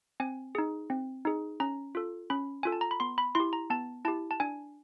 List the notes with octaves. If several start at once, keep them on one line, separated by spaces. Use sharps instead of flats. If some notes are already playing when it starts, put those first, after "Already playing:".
C4 G#5
D#4 G#4
C4
D#4 G#4
C#4 A#5
F4 A4
C#4 B5
F4 A4 G#5
A5
A#5
B5
B3 C6
B5
E4 G4 C6
A#5
B3 A5
E4 G4 A5
A5
D4 G#5